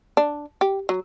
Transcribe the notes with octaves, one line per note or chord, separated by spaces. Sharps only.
D4
G4
F#3